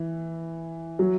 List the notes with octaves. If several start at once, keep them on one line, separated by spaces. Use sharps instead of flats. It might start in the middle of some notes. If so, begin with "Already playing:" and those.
Already playing: E3
F#3